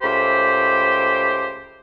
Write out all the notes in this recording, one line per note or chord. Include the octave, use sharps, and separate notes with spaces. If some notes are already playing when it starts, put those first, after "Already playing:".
C#2 A3 G4 C5 B5 D6